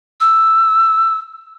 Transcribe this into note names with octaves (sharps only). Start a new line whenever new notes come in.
E6